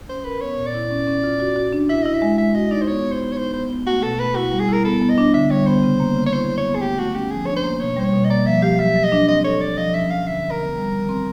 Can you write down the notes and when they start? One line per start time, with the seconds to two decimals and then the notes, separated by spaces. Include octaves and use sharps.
0.09 C#4 C5
0.24 A#4 B4
0.41 B3 C#5
0.58 A#2
0.66 D5
0.74 E4
0.91 C#4
1.07 C#4
1.23 F4
1.40 F#4
1.56 F#4
1.73 D4
1.89 E4 E5
2.03 E4 D#5
2.14 E5
2.22 G#3
2.38 G#3 E5
2.55 F#4 D#5
2.71 D#4 D5
2.81 C5
2.88 B3 C#5
3.04 B3
3.12 C5
3.21 B3
3.32 C#5
3.37 D#4 C5
3.53 B3 C5
3.70 B3
3.86 A3 F#4
4.03 B2 A4
4.19 A3 B4
4.35 E4 F#4
4.52 G3
4.60 G#4
4.68 E4 A#4
4.85 B3 A4
5.02 B3
5.10 D#5
5.18 D4
5.34 D3 E5
5.50 G3 C#5
5.67 B3 C5
5.83 C#3
6.00 A#3
6.16 C#3
6.26 C#5
6.32 E4 C5
6.49 F#3
6.57 C#5
6.66 B3
6.75 G#4
6.82 A3 G4
6.98 A3 F#4
7.15 C#4 G4
7.31 F3 G#4
7.46 D4 C#5
7.56 C5
7.64 A#3
7.80 B2 C#5
7.97 G3 C5
8.05 C#5
8.13 B2
8.24 D#5
8.30 A#3 D5
8.46 F3 E5
8.62 G4 F5
8.79 F#3 E5
8.96 F#3
9.04 D#5
9.12 D4
9.28 C4 D#5
9.44 A4 C#5
9.61 A4 D5
9.77 F3 D#5
9.94 C#4 E5
10.10 F3 F5
10.27 D3 E5
10.44 D3
10.51 A#4
10.60 B3
10.76 G3
10.92 D#3
11.09 C4